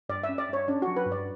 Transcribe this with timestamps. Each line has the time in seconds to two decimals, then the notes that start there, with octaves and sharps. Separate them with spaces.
0.09 G2 D5
0.23 E5
0.28 C#4
0.38 D5
0.49 G2 C#5
0.68 C#4 D4
0.82 F#3 F#4
0.97 B4
1.06 G2
1.12 D5